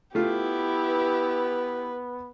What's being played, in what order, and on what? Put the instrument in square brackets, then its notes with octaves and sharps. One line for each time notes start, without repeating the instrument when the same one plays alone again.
[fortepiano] A3 F4 [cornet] B3 [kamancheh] E4 G4
[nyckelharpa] B4